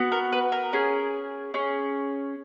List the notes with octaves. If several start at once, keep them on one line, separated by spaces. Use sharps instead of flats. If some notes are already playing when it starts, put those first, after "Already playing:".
Already playing: B3 F#4
A#4
B4
A#4
C#4 G#4
C#4 G#4